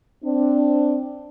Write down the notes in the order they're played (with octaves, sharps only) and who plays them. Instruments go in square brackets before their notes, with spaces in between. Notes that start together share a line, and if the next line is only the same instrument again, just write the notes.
[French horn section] C4 D4